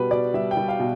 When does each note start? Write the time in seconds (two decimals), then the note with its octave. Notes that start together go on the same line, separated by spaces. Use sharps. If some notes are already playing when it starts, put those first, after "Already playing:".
Already playing: B2 G3 B4
0.11 B2 D5
0.34 G3 E5
0.51 G5
0.57 G3
0.69 F5
0.80 B2